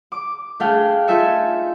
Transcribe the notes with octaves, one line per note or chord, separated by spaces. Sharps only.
D6
A3 D4 G#4 F5 G5
D#4 F4 A4 E5 G#5 C#7